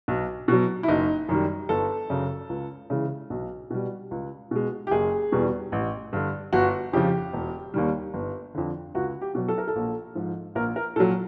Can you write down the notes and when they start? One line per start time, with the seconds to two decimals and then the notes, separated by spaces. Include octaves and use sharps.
0.08 B1
0.48 B2 F#3
0.83 E4
0.88 F#1 D#4
1.29 F#2 D#3 G3
1.69 G1 A4
2.10 F#2 C#3
2.49 C#2
2.90 C#3 E3 G#3
3.30 B1
3.70 B2 G3
4.11 C#2
4.51 B2 G#3
4.87 G4
4.91 F#1 G#4
5.32 E2 B2 G3
5.72 A1
6.13 G2 D3
6.53 G1 F#4
6.93 F2 C#3 F3 G4
7.33 E1
7.74 D#2 D#3 G3
8.14 G1
8.55 F2 D3
8.95 C#2 F#4
9.21 G4
9.35 B2 F#3
9.48 A4
9.58 A#4
9.68 A4
9.76 A#1
10.15 G#2 F3
10.55 A#1 A#4
10.76 A#4
10.96 A#2 A4
11.00 F#3